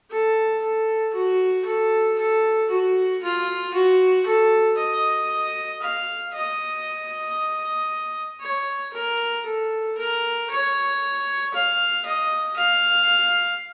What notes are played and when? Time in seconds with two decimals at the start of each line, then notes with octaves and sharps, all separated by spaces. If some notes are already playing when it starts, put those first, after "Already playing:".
0.10 A4
0.61 A4
1.13 F#4
1.65 A4
2.18 A4
2.70 F#4
3.22 F4
3.73 F#4
4.26 A4
4.77 D#5
5.82 F5
6.34 D#5
8.41 C#5
8.93 A#4
9.45 A4
9.97 A#4
10.50 C#5
11.53 F5
12.05 D#5
12.56 F5